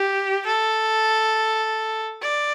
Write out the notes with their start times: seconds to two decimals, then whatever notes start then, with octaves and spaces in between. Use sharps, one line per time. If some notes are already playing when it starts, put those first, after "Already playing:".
Already playing: G4
0.46 A4
2.22 D5